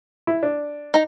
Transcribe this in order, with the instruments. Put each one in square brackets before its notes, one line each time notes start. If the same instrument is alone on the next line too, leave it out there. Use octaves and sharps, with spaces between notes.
[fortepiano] E4
D4
[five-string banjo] D#4 A#5